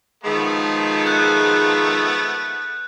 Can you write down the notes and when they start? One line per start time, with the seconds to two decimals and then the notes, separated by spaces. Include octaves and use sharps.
0.24 D#3 F3 G#3 A3 B3
1.06 F#6 G6